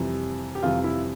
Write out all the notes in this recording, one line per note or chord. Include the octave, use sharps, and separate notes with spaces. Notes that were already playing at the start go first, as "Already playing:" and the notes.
Already playing: F2 C3 E3 G3
G4
F2 C3 E3 G3 F4
E4